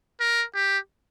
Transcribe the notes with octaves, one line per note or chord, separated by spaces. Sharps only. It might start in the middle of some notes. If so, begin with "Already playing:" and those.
A#4
G4